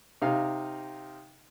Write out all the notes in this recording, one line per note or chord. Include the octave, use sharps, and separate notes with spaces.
C3 D#4 F5